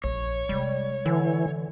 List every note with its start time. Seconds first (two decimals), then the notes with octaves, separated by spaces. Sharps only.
0.04 A#1 C#5
0.49 C3 G3 G#3
1.06 D3 E3